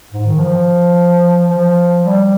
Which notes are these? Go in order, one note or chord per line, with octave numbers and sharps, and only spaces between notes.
G#2
D#3
F3
F3
G3